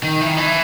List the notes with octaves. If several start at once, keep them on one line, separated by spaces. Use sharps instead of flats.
D#3
E3
D#3
E3